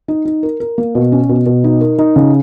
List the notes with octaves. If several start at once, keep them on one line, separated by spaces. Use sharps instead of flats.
D#4
D#4
A#4
A#4
A#3
B2
C#4
B2
B2
D#4
A#4
D#4
C#3